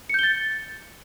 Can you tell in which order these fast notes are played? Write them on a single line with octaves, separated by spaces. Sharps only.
C#7 G6 G7 A6